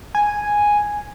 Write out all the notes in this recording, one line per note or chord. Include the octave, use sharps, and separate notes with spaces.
G#5